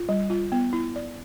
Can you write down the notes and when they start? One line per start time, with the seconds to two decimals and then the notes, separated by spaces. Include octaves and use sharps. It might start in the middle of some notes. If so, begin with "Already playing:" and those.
Already playing: F4
0.09 G3
0.30 F4
0.52 B3
0.73 E4
0.96 D5